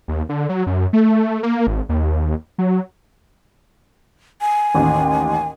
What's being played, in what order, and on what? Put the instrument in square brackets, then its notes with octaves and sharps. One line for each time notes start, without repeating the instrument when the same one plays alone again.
[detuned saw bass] D#2
D3
F#3
F#2
A3
A#3
G#1
D#2
F#3
[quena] G#5
[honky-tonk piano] A1 D#2